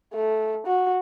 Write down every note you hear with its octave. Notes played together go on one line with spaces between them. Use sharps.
A3
F#4